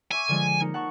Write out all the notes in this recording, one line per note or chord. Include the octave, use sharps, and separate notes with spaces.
E5 G#5 C#6 D6
D3 F3 G#3
A#3 D#4 C#7
F#5 A5 C#6